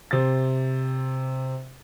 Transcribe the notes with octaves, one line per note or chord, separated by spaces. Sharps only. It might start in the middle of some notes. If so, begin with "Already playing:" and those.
C3 C5 A6